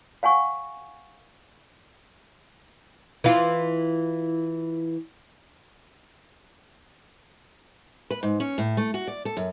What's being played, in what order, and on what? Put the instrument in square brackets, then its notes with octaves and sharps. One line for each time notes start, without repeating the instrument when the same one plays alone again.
[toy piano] F5 F#5 G#5 C#6
[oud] E3 F4
[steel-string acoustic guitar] B4
G#2
C#4
A2
A3
F#4
D5
A4
F#2